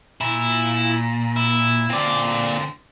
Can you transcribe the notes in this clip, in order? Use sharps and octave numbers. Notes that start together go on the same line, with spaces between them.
A#2 E4
E4
A#2 D3 C4 D5